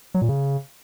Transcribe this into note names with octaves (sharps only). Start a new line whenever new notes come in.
F#3
A#2
C#3